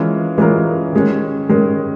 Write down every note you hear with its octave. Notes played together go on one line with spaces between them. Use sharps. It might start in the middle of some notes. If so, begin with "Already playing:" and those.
Already playing: E3 G#3 C#4 F4 A#4
E3 G#3 C#4 F4 A#4
D#3 G#3 C#4
D#3 G#3 C#4